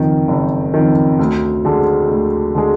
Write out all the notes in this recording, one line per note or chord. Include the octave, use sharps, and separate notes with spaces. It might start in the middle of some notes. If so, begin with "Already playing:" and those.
Already playing: F#1 F2 D#3
F#1
F2 D#3
D2
D3 G#3
D2
D3 G#3